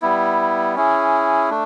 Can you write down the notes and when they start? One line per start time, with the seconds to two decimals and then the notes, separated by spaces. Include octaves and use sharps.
0.02 G3 B3 E4
0.76 C#4 E4 G#4
1.50 A3 D4